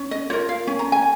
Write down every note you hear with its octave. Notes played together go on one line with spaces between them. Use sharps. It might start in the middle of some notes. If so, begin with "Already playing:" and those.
Already playing: C#4
D#5
F4 A#4 C#5
F5
C#4 G#5
A#5
G#5